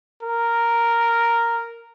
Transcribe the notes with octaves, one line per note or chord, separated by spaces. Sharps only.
A#4